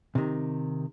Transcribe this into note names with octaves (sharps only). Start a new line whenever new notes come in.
C3 D#3